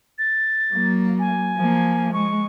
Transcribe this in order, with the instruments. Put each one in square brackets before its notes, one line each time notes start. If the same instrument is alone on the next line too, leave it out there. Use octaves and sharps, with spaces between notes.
[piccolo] A6
[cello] F#3 A#3
[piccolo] G#5
[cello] F3 A#3
[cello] G#3 [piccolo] C#6